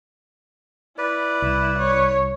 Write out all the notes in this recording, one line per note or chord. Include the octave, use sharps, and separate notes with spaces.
E4 B4 D5
C2
C#5